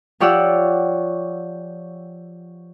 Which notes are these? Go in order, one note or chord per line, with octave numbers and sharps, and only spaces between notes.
F3 G4 C#5 D5 F#5 E6